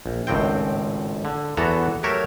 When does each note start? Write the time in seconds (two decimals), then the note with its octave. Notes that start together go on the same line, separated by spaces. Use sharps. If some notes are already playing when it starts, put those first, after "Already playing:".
0.06 A#1
0.27 G#1 C#2 A2 C4 G5
1.25 D3
1.57 E2 E3 B3 F#4 A4 A#5
2.03 F#3 A3 G4 A#4 C#5 E5